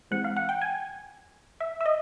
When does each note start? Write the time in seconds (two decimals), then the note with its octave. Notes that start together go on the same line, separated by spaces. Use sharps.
0.11 E3 G#3 C4 F#5
0.24 F5
0.37 F#5
0.49 G5
0.62 G#5
1.60 E5
1.81 E5
1.86 D#5